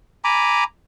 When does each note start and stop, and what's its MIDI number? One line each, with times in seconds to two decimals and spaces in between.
0.24 0.64 80
0.24 0.64 82
0.24 0.64 83
0.24 0.64 86